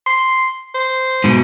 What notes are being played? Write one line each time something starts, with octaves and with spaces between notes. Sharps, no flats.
C6
C5
G#2 B2